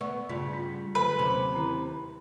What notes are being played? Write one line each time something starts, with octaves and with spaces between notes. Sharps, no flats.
A3 B3 D5 C#6
G2 C#3 F4
F4
D3 F#3 A3 B4
D#2 C3 C#4
D#3 E4